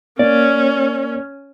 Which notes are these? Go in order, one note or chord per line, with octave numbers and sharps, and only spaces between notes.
A#3 C#4 D5